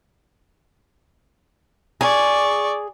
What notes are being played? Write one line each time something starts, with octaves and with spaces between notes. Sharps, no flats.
G#4 D5 C#6